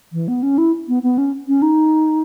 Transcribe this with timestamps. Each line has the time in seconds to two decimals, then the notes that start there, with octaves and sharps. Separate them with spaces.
0.13 E3
0.28 B3
0.43 C#4
0.58 E4
0.88 B3
1.03 B3
1.18 C#4
1.48 C#4
1.62 D#4